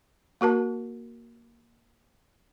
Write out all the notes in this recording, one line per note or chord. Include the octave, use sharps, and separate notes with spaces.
A#3 F#4 A#4 A5